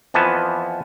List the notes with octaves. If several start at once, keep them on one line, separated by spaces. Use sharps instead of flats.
F2 E3 F3 B3 G#5 A5